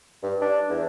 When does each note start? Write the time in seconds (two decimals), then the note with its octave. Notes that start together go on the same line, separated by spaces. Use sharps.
0.23 G2
0.42 D4
0.69 E2